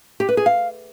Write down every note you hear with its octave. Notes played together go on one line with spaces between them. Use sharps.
G4
B4
G#4
F5